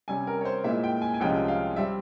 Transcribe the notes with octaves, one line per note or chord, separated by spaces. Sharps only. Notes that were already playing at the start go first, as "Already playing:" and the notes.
C3 G3 C#4 G#5
A#4
C#5
C5
A#2 G#3 E4 E5
G5
G#5
G#5
C2 C3 F3 G#3 C#4 G5
F5
G3 C4 E5